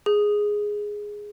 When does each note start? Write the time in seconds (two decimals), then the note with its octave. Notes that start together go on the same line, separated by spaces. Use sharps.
0.06 G#4